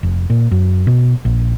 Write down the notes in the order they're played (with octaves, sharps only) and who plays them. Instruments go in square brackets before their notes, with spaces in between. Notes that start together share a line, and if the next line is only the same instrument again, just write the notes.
[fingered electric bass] F1
A#2
F#2
B2
A#1